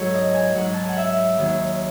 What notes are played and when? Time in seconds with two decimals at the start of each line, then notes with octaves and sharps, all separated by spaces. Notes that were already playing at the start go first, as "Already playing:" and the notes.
Already playing: G#2 F#3 A4 C#5
0.15 D#5
0.35 G#5
0.55 G#2 F#3 F#5
0.74 A5
0.82 G#5
0.89 F#5
0.97 E5
1.39 D#2 D#3 F#3